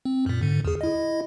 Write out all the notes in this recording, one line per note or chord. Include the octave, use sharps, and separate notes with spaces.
C4
F#2 A#2
G#2 D3
E2 G#4
E4 D#5